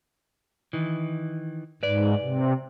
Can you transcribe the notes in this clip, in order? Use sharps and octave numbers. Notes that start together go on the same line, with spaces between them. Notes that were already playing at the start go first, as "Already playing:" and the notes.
D#3 E3
G#2 B4 D5
C3